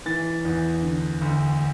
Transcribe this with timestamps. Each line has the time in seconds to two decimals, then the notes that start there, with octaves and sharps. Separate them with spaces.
0.06 E3 A6
0.45 E2
0.82 D3
1.21 D2